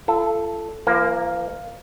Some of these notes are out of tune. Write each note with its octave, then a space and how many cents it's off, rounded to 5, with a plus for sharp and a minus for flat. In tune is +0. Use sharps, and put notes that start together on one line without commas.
F4 -40 A4 +0
F3 -45 A#3 +0